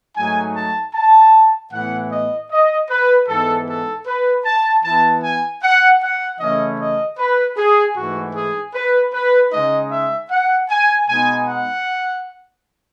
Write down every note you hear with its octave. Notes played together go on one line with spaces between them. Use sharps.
G#2 F#3 A3 D#4 G#5
A5
A5
A2 E3 B3 F#5
D#5
D#5
B4
G#2 E3 B3 A4
A4
B4
A5
E3 B3 E4 A5
G#5
F#5
F#5
C#3 E3 A3 C#4 E4 D#5
D#5
B4
G#4
G#2 E3 A3 F#4
G#4
B4
B4
C#3 G#3 D#4 D#5
E5
F#5
G#5
B2 G#3 B3 D#4 G#5
F#5